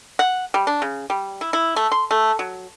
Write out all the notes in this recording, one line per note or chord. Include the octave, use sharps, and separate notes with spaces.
F#5
G3
D4
C#3
G3
E4
E4
A3
C6
A3
F#3